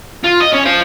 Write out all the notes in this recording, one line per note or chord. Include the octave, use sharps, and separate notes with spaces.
F4
D#5
C#4
C5 F5